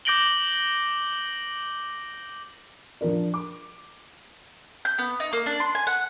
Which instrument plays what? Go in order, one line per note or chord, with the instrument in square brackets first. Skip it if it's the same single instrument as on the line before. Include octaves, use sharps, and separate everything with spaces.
[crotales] D6 G6 A#6 D7 F#7 G7
[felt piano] F3 D4 A#4 D5
D6
[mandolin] G6
B3
D#4
A#3
D4
C6
G#5
F#5